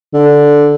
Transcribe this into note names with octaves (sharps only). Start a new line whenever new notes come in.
D3